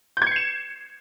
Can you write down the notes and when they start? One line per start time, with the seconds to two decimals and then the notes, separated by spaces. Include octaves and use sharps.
0.17 G6
0.22 G#6
0.27 C#7
0.31 C7
0.36 E7